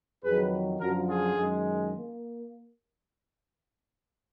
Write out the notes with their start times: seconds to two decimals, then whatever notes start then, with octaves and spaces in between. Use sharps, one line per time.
0.24 F2 D#3 F#3 G#4 B4
0.80 F#2 D3 F3 F#4 A#4
1.08 F4 G#4
1.36 F#2 D#3 G#3
1.92 A#3